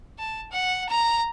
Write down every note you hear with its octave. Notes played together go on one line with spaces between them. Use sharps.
A5
F#5
A#5